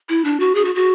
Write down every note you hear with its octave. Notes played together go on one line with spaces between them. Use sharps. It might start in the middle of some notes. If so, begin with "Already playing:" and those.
E4
D4
F#4
G#4
F#4
F#4